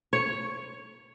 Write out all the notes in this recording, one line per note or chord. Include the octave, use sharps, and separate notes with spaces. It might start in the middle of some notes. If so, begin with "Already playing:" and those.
C#5